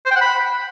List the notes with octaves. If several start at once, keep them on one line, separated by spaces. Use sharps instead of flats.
C5
G5
F#5
B5